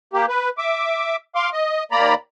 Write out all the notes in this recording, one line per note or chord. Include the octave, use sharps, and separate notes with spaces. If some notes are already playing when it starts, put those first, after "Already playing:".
A#3 G4
B4
E5 D6
F5 C6 D6
D#5
D#2 A#3 D5 A#5 B5